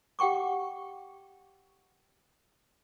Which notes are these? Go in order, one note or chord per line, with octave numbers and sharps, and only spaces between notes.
G4 F#5 G5 C#6 D6